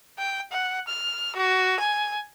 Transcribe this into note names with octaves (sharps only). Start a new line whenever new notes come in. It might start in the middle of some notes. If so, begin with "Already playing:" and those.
G5
F#5
F6
F#4
G#5